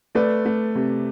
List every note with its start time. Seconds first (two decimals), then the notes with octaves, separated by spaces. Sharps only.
0.15 A3 B4 D5
0.46 A3
0.75 C3